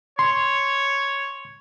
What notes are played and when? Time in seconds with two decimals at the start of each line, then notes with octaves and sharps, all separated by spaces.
0.19 C#5 C6